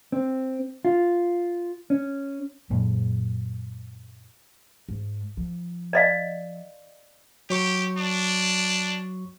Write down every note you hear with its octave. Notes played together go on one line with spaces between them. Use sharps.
C4
F4
C#4
F#2 A#2 G#3
G#2
F3
D5 D#5 F5
F#3 G4 C#6
D4